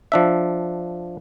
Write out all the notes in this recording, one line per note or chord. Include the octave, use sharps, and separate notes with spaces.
F3 D4 E5